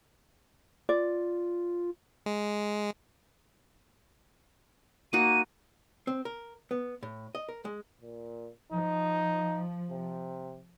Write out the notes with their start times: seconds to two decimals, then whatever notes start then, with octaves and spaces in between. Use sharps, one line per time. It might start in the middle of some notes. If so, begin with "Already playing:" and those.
0.89 F4 D5
2.26 G#3
5.13 A#3 D#4 F#4 D#7
6.07 C4
6.25 A#4
6.71 B3
7.03 A2
7.35 D#5
7.48 A#4
7.65 G#3
8.02 A#2
8.72 F3 D#4
9.90 C3